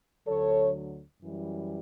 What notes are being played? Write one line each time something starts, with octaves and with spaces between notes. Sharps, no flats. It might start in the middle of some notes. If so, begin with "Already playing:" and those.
D2 D3 F#3 A4 C#5
F#2 E3 G3